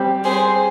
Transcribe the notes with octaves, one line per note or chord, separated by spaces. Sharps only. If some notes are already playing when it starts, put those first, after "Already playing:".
Already playing: G3 C4 G4
G#4 C5